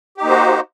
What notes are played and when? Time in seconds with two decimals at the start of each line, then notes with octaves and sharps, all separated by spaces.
0.18 G4
0.21 D#4
0.24 A#3
0.27 C5
0.30 F#4